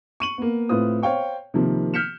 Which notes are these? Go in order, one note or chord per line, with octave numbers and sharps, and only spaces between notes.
C#6 D#7 F#7
A#3 B3
A2 C4 F4 B4 D#6
C5 C#5 F5 G5 C#6
C3 D#3 F3 A#3
F6 G6 B6 C#7 E7